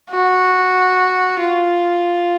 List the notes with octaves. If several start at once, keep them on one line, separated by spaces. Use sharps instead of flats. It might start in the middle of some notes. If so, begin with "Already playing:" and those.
F#4
F4